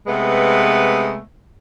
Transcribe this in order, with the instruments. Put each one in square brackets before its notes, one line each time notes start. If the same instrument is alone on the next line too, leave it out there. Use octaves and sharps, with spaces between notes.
[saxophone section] C3 G#3 A3 B3 B4